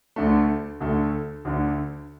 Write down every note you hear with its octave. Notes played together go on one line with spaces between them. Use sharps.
D2 D3 A3
D2 D3 A3
D2 D3 A3